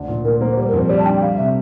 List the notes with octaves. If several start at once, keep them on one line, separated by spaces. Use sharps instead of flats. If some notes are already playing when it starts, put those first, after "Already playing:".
Already playing: D2 D4
A#2
A#2 A#4
A#3 C5
G3 C5
A#4
F2
C5
G3 D5
A5
D4 G5
G3 F5
C3 E5